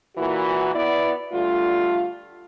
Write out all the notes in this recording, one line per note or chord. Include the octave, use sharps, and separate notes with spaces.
A#2 E3 F#4
B3 E4 D5
D3 G3 A3 F4